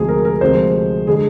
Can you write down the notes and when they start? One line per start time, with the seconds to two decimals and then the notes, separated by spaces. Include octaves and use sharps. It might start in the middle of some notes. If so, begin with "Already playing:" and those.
Already playing: D2 C3 F3 G#3 G#4
0.08 A#4
0.25 A#4
0.41 D2 C3 F3 G#3 C5
1.07 D3 G#3 G#4